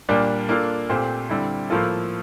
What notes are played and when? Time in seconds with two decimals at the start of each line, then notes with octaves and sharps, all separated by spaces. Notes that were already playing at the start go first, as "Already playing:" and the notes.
0.09 A#2 G3 A#3 D4
0.49 A#3 D4 F4 A4
0.90 A#2 A3 C4 G4 C5
1.30 D3 G3 C4 E4
1.70 A2 F3 A#3 F4 A4